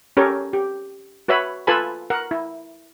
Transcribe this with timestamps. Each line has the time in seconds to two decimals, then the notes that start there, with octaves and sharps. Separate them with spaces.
0.17 C#4 G4 A4 A#4 C#5
0.53 G4
1.28 F#4 B4 C#5 E5 B5
1.67 F4 A4 B4 G#5 A5 B5
2.10 A#4 F#5
2.31 E4